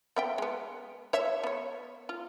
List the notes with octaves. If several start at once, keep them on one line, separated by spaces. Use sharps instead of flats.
B3 E5 G5
G#3 B3
C#5 E5
B3 C#5
F4